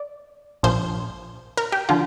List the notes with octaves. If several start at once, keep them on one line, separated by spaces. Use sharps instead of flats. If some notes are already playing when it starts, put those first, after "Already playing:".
Already playing: D5
A#1 A#2 F3 C5
A#4
G4
D3 F3 F4